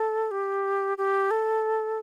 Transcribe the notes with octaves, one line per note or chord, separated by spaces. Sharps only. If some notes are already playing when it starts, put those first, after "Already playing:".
Already playing: A4
G4
G4
A4